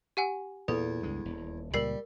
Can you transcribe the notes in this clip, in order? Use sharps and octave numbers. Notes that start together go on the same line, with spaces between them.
G4 F#5 G#5
E2 A#2 A4
C#2 G2 G#3
D#1
C#2 A#2 G3 A#4 C7 F#7